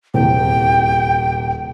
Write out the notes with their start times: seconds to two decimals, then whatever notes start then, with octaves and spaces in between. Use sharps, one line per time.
0.14 D#1 E2 C3 G5